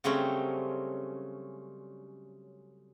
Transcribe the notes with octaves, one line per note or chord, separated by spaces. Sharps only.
C#3 F#3 G3 A3 C4 C#4